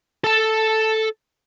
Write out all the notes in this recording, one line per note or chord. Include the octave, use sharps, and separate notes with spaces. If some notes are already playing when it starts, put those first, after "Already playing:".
A4 A5